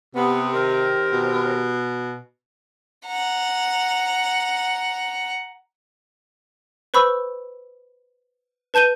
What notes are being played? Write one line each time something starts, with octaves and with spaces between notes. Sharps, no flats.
C3 B3 G4
D#3 C4 A#4
B2
F#5 A#5
B4 C5 B5 C#6 E6
B4 A5 G6 D#7 G7